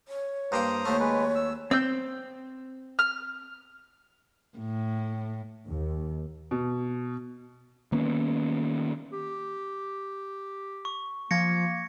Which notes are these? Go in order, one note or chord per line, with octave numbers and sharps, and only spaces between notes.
C#5
G2 A#3 C5 G5 A#5 D#6
D#2 A3 C#5
G#3 B4
E6
C4 E6 G6
F6
A2
D#2
B2
D#3 A#3 B3 C#4
G4
C#6
F3 A#3 G#6 A#6 C#7